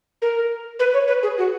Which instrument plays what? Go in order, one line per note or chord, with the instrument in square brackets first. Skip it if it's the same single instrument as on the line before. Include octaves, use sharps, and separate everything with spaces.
[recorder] A#4
B4
C#5
B4
G#4
F#4